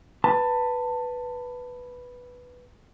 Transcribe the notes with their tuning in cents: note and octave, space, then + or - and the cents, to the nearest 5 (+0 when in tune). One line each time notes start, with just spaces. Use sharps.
B4 +0 A5 +20